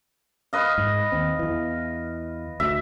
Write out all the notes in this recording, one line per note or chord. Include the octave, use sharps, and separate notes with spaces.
B4 D#5 F5
G#2
D#2 C4
E2 E3
D2 E5